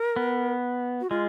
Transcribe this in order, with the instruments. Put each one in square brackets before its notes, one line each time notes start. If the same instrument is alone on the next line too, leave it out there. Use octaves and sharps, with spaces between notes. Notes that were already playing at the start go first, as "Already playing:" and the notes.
Already playing: [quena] A#4
[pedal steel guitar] B3
[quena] F#4
[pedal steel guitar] G#3 [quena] F4